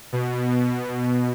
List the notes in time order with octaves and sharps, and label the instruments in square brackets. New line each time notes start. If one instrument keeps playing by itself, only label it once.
[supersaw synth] B2